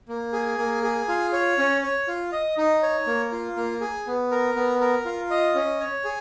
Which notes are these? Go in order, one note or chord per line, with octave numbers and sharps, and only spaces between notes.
A#3
G#4
A#3
G#4
F4
C#5
C#4
C#5
F4
D#5
D#4
C#5
A#3
F4
A#3
G#4
B3
A#4
B3
A#4
F4
D#5
C#4
C#5
G#4